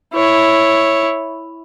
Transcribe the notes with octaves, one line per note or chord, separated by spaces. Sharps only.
E4 C#5